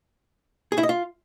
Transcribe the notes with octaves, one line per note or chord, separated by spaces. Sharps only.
G#4
E4
D#5
F4